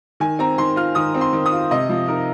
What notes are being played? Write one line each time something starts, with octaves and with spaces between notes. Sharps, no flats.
D#3 G#5
C4 A#5
D#3 C6
F4 F6
D#3 D#6
C4
C6
D#3
D#6
F4
C3 D#5
F3
D#4 A#4